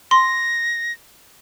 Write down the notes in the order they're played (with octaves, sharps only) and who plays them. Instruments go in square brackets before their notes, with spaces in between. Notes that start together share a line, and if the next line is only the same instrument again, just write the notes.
[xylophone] C6 [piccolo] A#6